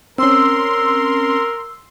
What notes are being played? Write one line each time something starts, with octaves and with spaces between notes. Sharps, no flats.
C4 C#4 A#4 C6 E6